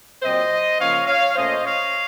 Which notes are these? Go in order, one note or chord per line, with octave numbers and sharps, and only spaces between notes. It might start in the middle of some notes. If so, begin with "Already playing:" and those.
A#2 F#3 C4 C5 D#5
C#3 F3 A#3 C#4 C#5 F5
C#5 F5
A#2 A3 C#4 C5 D#5
C#5 F5